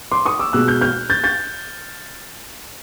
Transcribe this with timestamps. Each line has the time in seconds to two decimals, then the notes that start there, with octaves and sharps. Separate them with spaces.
0.11 C6 D6
0.26 C#6 D#6
0.39 D6 E6
0.53 B2 G#3 E6 F#6
0.68 F6 G6
0.81 F6 G6
1.10 G6 A6
1.24 G6 A6